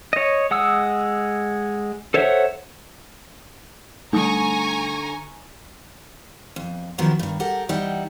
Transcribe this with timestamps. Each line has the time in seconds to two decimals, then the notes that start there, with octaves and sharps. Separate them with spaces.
0.13 C#5 D#5
0.51 G#3 F#5 D#6 E6
2.14 A4 C5 C#5 E5 F#5
4.13 D3 G3 A3 D#4 G#5 A#5 C#6 D#6
6.56 F2
6.98 D#3 F3 F#3 B3 E4
7.19 G2 D#3
7.40 G4 A4 A#4 F#5
7.69 E3 G3 D#4 E4 F#5 G5